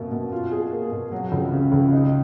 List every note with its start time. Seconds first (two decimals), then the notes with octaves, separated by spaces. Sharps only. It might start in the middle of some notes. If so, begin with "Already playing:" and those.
Already playing: F#2 B2 A#3
0.12 B2
0.32 F4
0.51 G#4
0.72 A#3
0.91 B2
1.12 F#3
1.32 C#2
1.52 C#3
1.72 C#2
1.92 D#4